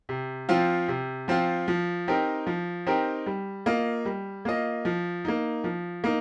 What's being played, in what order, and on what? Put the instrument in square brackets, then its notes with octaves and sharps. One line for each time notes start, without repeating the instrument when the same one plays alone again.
[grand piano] C3
F3 C4 F4
C3
F3 C4 F4
F3
C4 D#4 G4 A#4
F3
C4 D#4 G4 A#4
G3
A#3 F4 D#5
G3
A#3 F4 D#5
F3
A#3 D#4
F3
A#3 D#4